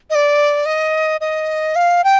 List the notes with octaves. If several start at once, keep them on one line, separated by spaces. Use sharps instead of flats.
D#5
D5
D#5
D#5
F5
G5